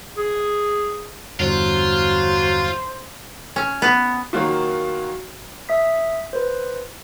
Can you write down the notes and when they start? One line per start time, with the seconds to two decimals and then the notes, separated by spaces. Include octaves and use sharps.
0.17 G#4
1.40 E2 G2 D3 F#3 F4 C5
3.56 C#4
3.82 B3
4.33 D#3 F#3 A#3 F4 F#4
5.69 E5 D#6 B6
6.33 B4 C5